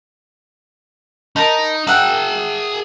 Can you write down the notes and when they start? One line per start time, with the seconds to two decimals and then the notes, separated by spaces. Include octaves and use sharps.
1.36 D#4 A#4 A5 B5
1.87 G#4 E5 F#5 G5 A5